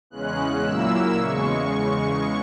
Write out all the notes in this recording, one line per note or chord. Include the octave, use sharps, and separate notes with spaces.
E2 C#3 G#3 C#4 F#6
A#2 F#3 A#3 E4 E6
E2 C#3 G#3 C#6